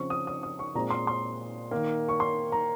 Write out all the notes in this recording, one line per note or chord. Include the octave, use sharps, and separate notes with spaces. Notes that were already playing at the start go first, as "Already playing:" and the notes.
Already playing: C#3 F3 C4 C#6
D#6
D#6
D#6
C#6
A#2 G#3 C4 A#5
C6
C6
D#3 A#3
C#6
C6
A#5